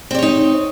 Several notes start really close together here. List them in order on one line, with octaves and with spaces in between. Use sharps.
C4 D5 C#5 D#4